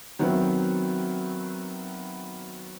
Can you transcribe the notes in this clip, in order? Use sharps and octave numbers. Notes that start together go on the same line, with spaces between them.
D#3 F#3 B3 C4 E4